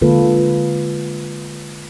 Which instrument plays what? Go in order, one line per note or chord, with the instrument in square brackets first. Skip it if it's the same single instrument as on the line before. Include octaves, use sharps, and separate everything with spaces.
[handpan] D3 G#3 A#3 F4 A4 B4